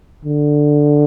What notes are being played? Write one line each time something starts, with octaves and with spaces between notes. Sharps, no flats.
D3